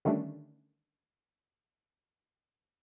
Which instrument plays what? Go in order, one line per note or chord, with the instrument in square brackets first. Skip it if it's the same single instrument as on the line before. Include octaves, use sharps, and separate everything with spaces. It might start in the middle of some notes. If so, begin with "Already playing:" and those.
[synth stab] D3 D#3 G3 A3 C#4 D4